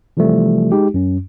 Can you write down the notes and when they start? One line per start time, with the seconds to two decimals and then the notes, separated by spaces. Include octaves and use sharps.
0.17 C3 E3 F3 G3 A3
0.72 G#3 D#4 G4
0.94 F#2 C#4